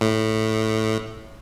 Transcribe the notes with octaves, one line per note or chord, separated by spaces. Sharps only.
A2